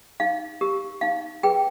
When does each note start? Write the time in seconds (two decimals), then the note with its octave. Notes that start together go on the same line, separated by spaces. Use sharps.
0.20 D#4 F5
0.61 G4 A#4
1.01 D#4 F5
1.43 G#4 B4 G5